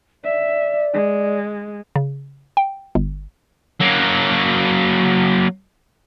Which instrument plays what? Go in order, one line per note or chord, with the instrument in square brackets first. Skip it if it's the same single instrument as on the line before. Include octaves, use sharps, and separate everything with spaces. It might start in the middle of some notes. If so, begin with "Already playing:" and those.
[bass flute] D5 [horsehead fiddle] E5
[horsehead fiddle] G#3
[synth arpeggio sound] C#3
G5
G1
[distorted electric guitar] F#3 A#3